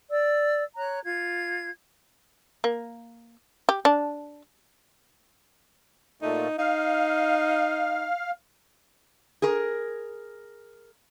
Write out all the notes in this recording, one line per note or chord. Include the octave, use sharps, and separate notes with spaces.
D5 E6
C#5 A#5 F#6
F4 G#6
A#3
G4
D4
A#2 A3 D#4
D#4 F5
G#4 A#4